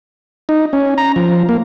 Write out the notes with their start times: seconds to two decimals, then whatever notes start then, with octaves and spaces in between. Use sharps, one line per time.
0.49 D#4
0.73 C#4
0.98 A#5
1.16 F3
1.49 A#3